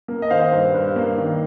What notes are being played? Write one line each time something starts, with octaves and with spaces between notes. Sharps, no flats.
A#3
D#5
D#3 C5 F5
G2
G2
A#3
D#3